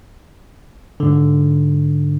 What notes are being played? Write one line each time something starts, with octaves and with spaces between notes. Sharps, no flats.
G#2 D3